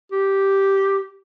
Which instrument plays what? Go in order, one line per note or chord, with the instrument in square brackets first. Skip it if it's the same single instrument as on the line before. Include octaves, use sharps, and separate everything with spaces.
[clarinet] G4